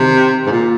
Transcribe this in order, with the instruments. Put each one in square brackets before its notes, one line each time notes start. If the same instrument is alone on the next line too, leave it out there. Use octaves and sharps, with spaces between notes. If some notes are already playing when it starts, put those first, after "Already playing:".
Already playing: [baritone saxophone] C3 [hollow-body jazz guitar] D#3
[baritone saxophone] G#2
A#2